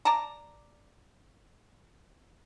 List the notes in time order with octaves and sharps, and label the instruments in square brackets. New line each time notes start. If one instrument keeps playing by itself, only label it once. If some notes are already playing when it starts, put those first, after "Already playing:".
[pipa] D5 A5 A#5